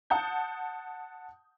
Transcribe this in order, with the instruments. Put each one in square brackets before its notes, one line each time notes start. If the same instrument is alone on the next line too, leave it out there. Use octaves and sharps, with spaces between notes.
[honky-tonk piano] F#5 A5 D#6 G6